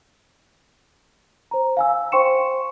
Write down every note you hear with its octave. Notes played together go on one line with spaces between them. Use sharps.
C5 A#5
F5 G#5 E6
C5 G5 C6 C#6 C#7 E7